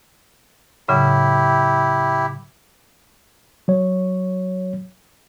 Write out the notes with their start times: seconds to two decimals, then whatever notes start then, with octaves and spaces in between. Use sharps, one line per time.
0.89 A2 C#3 F#3 E4 G4
3.68 F#3 C#5